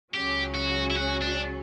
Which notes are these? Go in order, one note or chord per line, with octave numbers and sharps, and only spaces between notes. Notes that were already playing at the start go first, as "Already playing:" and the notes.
C#2 C#3 F#3 C#4 G4
F#4
E4
F#4
D4